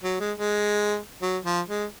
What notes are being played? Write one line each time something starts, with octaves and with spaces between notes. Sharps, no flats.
F#3
G#3
G#3
F#3
F3
G#3